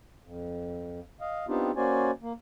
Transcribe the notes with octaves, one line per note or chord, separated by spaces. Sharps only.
F2
D#5 F5
B3 C4 D4 D#4 F4 G4
A#3 C#4 F#4 C5 D5 G#5
A#3